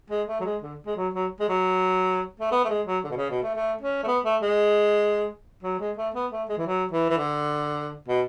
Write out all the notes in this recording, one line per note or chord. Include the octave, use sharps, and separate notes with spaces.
G#3
A3
F#3
G#3
D3
G#3
F#3
F#3
G#3
F#3
A3
B3
A3
G#3
F#3
D3
B2
C#3
B2
A3
A3
C#4
A3
B3
A3
G#3
F#3
G#3
A3
B3
A3
G#3
E3
F#3
E3
E3
D3
B2